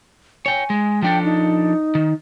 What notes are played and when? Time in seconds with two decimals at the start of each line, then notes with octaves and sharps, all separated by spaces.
0.46 C#5 G5 G#5
0.70 G#3
1.02 F3 D4 A4 G5
1.24 D#4
1.95 D#3